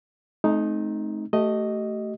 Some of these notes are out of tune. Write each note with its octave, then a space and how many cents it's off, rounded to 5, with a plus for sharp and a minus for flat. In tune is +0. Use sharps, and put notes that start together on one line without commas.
A3 -40 C4 +0 D#4 +0
A3 +5 G4 -35 D#5 +0